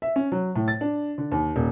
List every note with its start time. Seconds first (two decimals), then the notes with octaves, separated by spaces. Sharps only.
0.02 E5
0.16 C#4
0.32 F#3
0.56 A2
0.68 A6
0.81 D4
1.18 D3
1.32 D#2
1.56 D#1